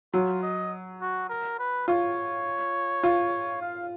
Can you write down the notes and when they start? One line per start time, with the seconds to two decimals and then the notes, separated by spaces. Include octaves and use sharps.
0.13 F#3 F4
0.42 D#5
1.01 F#4
1.29 A#4
1.59 B4
1.88 F4 C#5
3.03 F4
3.61 F5